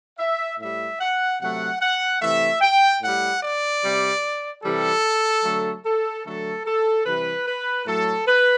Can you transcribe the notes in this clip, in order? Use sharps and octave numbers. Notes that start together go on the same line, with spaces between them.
E5
A2 G3 E5
F#5
C3 F#3 A3 F#5
F#5
C3 E3 A3 E5
G5
A2 G3 F#5
D5
C3 G3
C3 E3 G3 A4
D3 F#3 A3
A4
D3 F#3 A3 A4
A4
C3 E3 G3 B4
B4
A2 F#3 A3 A4
B4